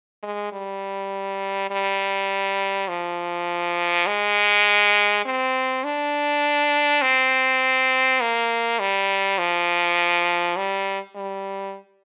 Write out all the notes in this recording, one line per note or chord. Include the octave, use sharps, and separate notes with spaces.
G#3
G3
G3
F3
G#3
C4
D4
C4
A#3
G3
F3
G3
G3